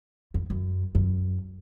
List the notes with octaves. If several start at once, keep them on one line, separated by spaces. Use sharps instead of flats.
F2
F#2
F#2